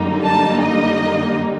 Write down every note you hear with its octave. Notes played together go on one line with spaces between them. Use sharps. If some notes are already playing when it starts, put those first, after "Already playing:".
Already playing: F#2 D3 G3 A#3 D#4
A5
D#5